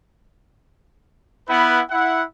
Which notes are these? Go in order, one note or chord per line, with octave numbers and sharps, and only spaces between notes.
B3 E4 B4 F#5
E4 F#5